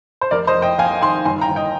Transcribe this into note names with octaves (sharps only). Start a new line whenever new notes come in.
C5
F1 A#4 D5
C5 D#5
F2
D#5 G5
F2 F5 G#5
D#3 G#5 C6
G1 G#5 C6
G5 A#5
G1
D#5 G5